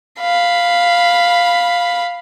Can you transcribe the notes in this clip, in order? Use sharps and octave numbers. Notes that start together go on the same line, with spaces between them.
F5 B5